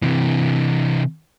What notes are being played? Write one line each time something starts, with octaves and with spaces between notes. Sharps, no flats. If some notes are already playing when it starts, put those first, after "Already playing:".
C3 E3